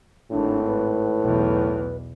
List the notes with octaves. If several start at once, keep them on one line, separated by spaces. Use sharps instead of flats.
G#1 A2 D4
B4
B1 E2